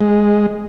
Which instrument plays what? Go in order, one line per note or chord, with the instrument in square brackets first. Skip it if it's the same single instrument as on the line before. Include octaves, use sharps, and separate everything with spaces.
[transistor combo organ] G#3